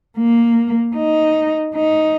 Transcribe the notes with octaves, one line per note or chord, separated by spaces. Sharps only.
A#3
D#4
D#4